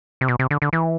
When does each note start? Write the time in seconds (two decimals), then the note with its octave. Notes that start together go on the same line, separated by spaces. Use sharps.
0.21 C3
0.28 B2
0.39 C3
0.51 D3
0.62 D3
0.73 E3